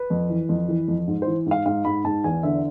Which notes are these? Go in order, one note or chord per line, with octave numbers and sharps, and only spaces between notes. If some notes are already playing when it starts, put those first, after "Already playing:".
Already playing: B4
F2
E3
F2
E3
F2
G#2
E3 C5
G#2 F5
G#2 F5
G#2 B5
G#2 A5
E2 G#5
D3 E5